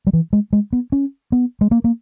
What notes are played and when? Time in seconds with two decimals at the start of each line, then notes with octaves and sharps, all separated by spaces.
0.07 G3
0.13 E3
0.33 G#3
0.53 G#3
0.73 B3
0.92 C#4
1.32 B3
1.61 G#3
1.71 A#3
1.84 A#3